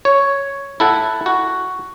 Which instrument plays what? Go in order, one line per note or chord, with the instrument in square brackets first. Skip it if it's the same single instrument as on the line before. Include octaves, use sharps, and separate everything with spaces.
[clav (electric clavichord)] C#5
E4 A4 F#5
F#4